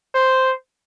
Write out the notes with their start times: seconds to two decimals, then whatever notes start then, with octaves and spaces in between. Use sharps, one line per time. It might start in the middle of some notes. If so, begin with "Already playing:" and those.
0.15 C5